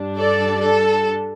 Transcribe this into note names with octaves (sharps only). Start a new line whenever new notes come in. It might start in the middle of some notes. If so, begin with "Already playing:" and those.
Already playing: G2 G3 D4
A4 D5
A4